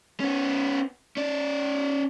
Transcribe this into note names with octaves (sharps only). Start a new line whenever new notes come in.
B3 C#4
C#4 D5